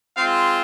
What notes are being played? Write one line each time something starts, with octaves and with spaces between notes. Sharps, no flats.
G#3 C4 F4 F5